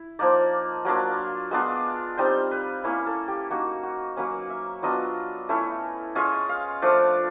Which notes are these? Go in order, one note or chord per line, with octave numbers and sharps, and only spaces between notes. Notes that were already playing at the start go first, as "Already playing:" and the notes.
Already playing: E4
F3 A#3 D#4 D5
F#3 A#3 D4 F4
G#3 B3 D4 F4
G3 C4 D#4 C5
B4
A#3 C#4 E4
A4
G4
A#3 D#4 F#4
F#4
F#3 A#3 C#4 B4
E5
F#3 B3 D4 F4 D#5
A3 C#4 E4
G#3 C#4 F4 E5
F5
F3 A3 D4